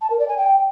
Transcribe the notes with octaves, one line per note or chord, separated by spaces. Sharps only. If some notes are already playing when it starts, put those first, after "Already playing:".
A5
A#4
D5
G#5
G5